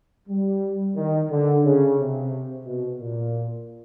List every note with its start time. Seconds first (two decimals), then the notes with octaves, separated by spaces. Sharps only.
0.28 G3
0.96 D#3
1.30 D3
1.64 C#3
1.97 C3
2.65 B2
2.99 A#2